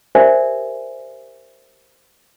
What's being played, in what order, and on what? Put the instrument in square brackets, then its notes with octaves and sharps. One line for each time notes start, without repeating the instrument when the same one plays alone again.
[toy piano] G4 A#4 C5 D5 E5 G#5